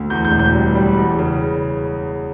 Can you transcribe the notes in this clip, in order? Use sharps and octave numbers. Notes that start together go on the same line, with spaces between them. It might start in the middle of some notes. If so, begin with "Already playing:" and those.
Already playing: D2
E2 G6
G6
E1
G6
G3
G3
E2
C#3